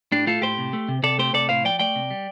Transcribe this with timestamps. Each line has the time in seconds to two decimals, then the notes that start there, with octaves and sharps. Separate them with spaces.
0.12 A2 D4 G4
0.27 A3 F4 A4
0.42 A2 G4 C5
0.58 C3
0.73 A3
0.89 C3
1.03 C3 A4 D5
1.18 A3 G4 C5
1.33 C3 A4 D5
1.49 A2 C5 F5
1.64 F3 D5 G5
1.80 A3 D5 G5
1.96 C3
2.11 G3